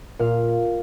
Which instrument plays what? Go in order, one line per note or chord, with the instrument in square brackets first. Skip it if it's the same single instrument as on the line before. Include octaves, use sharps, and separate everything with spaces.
[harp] A#2 F5